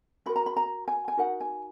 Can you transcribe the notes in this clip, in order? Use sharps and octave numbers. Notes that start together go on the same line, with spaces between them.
D#4 F#4 A#4 B5
A#5
B5
A#5
G#5
G#5
D#4 F#4 A#4 F#5
G#5